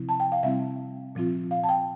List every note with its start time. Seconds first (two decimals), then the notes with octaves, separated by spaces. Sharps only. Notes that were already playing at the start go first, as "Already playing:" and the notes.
Already playing: C3 F3 C4 E4
0.09 A5
0.20 G5
0.32 F5
0.43 C3 G3 C4 E4 E5
1.15 A#2 F3 C4 F4
1.51 F5
1.64 A5
1.69 G5